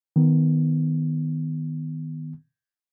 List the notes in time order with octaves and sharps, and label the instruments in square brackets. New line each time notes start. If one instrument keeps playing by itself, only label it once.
[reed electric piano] D#3 B3